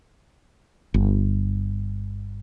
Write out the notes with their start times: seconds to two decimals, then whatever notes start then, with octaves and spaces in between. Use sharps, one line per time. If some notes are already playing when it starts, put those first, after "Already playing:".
0.94 G1